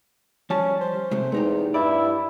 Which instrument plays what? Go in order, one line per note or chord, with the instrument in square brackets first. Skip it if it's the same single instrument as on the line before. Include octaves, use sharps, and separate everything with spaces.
[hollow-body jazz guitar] F3 G3 A5 [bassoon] C#4
[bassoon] C5
[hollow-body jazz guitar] C3 G#3 A3
[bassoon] E2 [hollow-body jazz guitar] A3 D#4 G4
[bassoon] G2 [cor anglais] E4 [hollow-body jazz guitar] D5